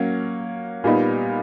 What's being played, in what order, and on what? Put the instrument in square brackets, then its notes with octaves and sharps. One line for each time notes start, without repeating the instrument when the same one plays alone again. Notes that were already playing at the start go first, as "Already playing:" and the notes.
Already playing: [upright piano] F#3 A#3 C#4
A#2 G3 B3 D#4